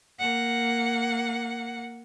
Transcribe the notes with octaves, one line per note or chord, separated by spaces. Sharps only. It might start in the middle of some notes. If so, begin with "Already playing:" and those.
A#3 F#5